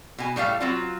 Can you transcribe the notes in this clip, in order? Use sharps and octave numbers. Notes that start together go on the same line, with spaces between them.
B2 G#5
A2 G3 A3 F5
F#3 C4 F4